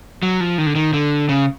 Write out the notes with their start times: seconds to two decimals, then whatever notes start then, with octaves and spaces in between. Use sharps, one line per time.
0.23 F#3
0.41 F3
0.58 D#3
0.66 D3
0.75 D#3
0.93 D3
1.29 C#3